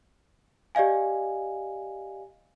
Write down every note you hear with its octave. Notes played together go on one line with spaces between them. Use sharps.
G4 D5 D#5 F5 G#5